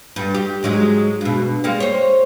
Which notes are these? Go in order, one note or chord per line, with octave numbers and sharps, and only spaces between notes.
G2
G4
G#2 F#3 G#3
G2 B2
G3 G#3 A#3
C5 C#5